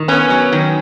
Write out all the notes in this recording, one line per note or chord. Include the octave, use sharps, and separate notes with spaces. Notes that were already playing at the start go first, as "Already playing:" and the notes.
Already playing: D#3
B3 C#4
F#3
D#3